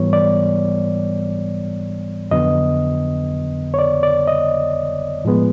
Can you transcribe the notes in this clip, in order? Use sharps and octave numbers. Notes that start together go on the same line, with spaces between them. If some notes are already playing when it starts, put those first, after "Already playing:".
Already playing: G#2 E3 G3 B3 C#5
D5
F2 D3 F#3 B3 D#5
C#5
D5
D5
D#5
A2 F3 G#3 B3